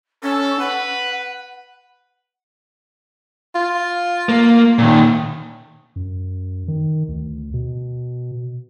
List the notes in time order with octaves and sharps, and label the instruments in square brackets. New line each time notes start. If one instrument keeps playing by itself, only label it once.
[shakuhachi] C#4 [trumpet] A4
[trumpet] B4 [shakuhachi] F#5
[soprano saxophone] F4
[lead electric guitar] A#3
A#2 D#3
[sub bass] F#2
D#3
D2
B2